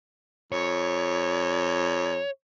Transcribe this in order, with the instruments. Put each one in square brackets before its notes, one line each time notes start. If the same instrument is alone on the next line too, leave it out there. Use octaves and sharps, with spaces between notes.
[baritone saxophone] F2 [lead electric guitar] C#5